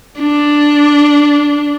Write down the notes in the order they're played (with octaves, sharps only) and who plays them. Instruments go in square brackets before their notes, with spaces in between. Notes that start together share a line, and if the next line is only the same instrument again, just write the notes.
[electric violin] D4